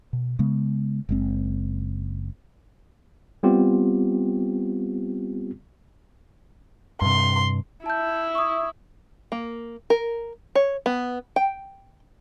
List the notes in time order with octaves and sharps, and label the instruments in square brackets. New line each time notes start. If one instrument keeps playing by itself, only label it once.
[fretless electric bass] B2
C#3 G#3 B3
F#1 G#3 C4
[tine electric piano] G3 B3 C4 F4 G4
[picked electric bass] G2 C3 [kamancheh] C6
[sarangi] E4 [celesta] A5 G6
[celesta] C#6 D#6
[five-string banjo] A#3
A#4
C#5
B3
G5